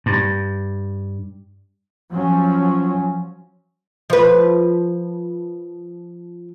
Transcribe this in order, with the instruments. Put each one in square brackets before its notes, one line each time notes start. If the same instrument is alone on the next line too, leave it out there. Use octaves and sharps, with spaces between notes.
[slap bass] G2
[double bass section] F3 F#3 C#4
[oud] F3 B4